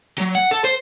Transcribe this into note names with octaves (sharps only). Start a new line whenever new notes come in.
F#3
F#5
A4
C5